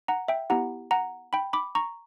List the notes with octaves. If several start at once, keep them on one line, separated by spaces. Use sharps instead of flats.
F#5 A#5
E5 G5
B3 E4 G4 F#5 A#5
F#5 A#5
G5 B5
B5 D6
A#5 C#6